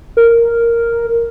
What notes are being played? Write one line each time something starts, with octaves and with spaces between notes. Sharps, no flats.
A#4